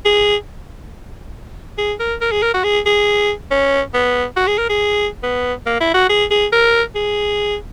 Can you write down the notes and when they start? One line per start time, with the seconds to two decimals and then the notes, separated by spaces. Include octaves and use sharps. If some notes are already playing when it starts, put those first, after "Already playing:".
0.05 G#4
1.78 G#4
1.99 A#4
2.21 A#4
2.32 G#4
2.42 A#4
2.54 F#4
2.64 G#4
2.86 G#4
3.51 C#4
3.94 B3
4.36 F#4
4.47 G#4
4.58 A#4
4.69 G#4
5.23 B3
5.66 A#3
5.80 E4
5.94 F#4
6.09 G#4
6.31 G#4
6.52 A#4
6.95 G#4